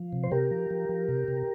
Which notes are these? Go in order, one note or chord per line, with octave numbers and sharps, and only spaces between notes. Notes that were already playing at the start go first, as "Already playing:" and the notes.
Already playing: F3
C3
C5
C3 G4 A#4
F3
F3
F3
C3
C3